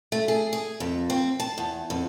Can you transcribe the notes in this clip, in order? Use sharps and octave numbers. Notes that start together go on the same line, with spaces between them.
A3
G#4
G#4
F2
C4
A5
E2
F2